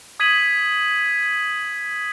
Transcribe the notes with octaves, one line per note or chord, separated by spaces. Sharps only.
D#6 G#6 B6 D#7 F#7